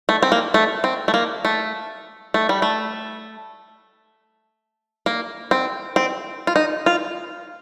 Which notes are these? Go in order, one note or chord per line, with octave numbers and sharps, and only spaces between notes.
A3
C4
A#3
A3
C4
A3
A#3
A3
A3
G3
A3
A#3
C4
C4
F4
D#4
F4